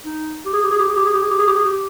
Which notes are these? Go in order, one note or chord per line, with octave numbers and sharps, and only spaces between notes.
D#4
G4
G#4
G4
G#4
G4
G#4
G4
G#4
G4
G#4
G4
G#4
G4
G#4
G4